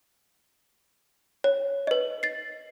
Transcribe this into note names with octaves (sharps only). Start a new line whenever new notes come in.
C#5
B4 D#5
A6 C7